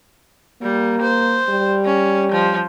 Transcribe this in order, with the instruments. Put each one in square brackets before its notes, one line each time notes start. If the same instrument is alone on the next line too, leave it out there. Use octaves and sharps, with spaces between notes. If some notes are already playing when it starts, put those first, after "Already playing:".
[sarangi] G3 [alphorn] A#3
[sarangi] C5
[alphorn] G3
[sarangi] C#4
F3